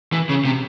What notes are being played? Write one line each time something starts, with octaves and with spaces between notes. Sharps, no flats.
E3
C#3
C3